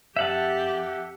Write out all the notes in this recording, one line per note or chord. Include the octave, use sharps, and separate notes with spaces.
F2 G4 E5 F#5 A5